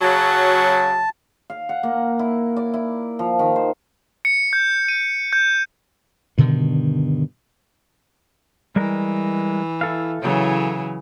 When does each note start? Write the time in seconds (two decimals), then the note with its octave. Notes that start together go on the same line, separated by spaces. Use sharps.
0.01 C#3 F#3 A5
1.50 F5
1.69 F#5
1.83 A#3
2.19 E4
2.57 D5
2.74 E4
3.19 F3
3.39 D#3
3.56 C5
4.25 C#7
4.53 G6
4.88 D#7
5.33 G6
6.38 G2 B2 D3 D#3
8.76 E3 G3 G#3 A#4
9.81 E4 A4 F5
10.21 C#3 E3 F#3